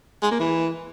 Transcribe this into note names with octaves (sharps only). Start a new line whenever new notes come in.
G#3
A#3
E3